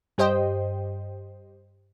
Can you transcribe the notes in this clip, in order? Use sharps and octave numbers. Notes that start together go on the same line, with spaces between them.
G2 G4 C5 D#5 G5